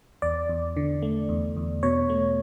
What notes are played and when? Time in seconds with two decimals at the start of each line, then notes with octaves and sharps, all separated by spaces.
0.22 E2 D5
0.49 E2
0.77 D3
1.02 A3
1.29 E2
1.56 E2
1.83 B2 C#5
2.10 A3